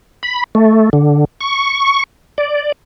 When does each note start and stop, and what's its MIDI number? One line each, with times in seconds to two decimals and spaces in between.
0.23 0.44 83
0.55 0.90 57
0.93 1.25 50
1.41 2.03 85
2.38 2.72 74